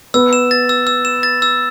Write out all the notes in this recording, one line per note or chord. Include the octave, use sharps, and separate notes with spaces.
B3 E6
E7
A6
E6
E6
E7
A6
E6